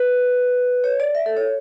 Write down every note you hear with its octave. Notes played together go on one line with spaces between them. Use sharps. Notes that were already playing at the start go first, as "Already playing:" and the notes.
Already playing: B4
C#5
D5
E5
A4
C#5